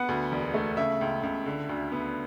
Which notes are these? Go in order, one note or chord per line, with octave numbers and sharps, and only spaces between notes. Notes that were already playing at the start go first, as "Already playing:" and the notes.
Already playing: B3 F#5
D2
E1
A3
C#3 E5
C#2
C#2
D3
D2
B3